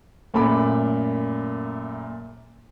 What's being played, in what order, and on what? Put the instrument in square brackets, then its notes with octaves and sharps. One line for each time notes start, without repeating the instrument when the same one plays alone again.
[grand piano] F#2 A#2 A3 B5 D6